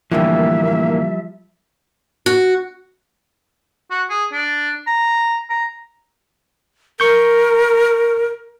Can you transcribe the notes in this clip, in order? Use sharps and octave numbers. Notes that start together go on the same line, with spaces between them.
A2 D3 E3 F3 G3 A#3 E5
F#4
F#4
G#4
D4
A#5
A#5
A#4 C#6 G6